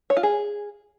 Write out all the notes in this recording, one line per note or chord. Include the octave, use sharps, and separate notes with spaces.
C#5
F4
G#4